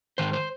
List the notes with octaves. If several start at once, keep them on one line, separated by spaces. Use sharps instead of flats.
G#2 D#3 C5
C5